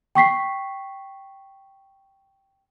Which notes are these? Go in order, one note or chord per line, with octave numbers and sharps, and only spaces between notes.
G5 C#6 B6 C7